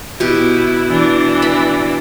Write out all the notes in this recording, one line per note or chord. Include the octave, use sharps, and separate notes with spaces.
B2 E4 G4
E3 D4
B5